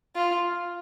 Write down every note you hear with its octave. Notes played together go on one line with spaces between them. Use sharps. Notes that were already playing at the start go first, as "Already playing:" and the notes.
F4